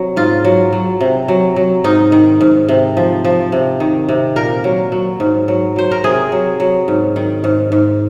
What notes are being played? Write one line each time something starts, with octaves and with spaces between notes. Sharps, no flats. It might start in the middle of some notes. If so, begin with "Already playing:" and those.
Already playing: C3 F#3
G#2 F4
F#3
F#3
C3
F#3
F#3
G#2 D#4
D#3
G#2
C3
F3
F3
C3
D#3
C3
A#2 A#4
F#3
F#3
G#2
F#3
F#3 C5
A#4
C3 G#4
F#3
F#3
G#2
D#3
G#2
G#2